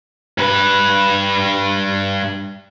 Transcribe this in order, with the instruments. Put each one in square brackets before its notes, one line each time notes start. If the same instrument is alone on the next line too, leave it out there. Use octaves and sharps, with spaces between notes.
[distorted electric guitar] G2 B4